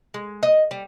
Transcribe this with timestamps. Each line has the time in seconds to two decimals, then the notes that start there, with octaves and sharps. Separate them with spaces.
0.14 G#3
0.43 D#5
0.71 G3